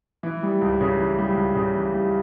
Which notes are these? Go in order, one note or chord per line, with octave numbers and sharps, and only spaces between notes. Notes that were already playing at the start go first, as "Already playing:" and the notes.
E3
G3
C#2
C#3
E3
G3
C#2
C#3
E3
G3